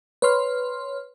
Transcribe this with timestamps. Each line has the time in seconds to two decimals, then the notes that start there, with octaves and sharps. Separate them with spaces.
0.22 B4 C#5 C6 F6